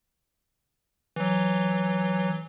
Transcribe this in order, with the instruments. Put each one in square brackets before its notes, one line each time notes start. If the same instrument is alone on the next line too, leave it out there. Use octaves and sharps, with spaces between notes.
[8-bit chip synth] E3 F#3